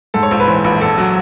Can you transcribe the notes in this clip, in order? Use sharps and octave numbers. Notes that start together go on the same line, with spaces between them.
G#2 A4
C#5
A#1 C5
B4
E3 C5
A#1 B4
E2 A4
F#3